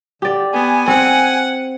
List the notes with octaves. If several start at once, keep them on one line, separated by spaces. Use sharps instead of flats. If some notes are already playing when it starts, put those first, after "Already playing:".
D3 G4 D5
B3 G#5
C4 F#5